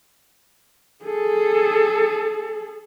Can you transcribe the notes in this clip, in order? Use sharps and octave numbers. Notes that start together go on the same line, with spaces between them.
G#4 A4